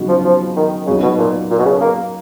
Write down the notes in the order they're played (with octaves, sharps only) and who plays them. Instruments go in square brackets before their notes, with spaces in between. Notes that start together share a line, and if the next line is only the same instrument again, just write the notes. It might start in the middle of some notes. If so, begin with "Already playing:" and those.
Already playing: [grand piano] C#3 F#3 B3 D#4 F#4
[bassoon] F3
F3
D#3
[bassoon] C#3 [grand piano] F#3 B3 D#4 F#4
[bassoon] B2
A#2
A#2
B2
C#3
A#3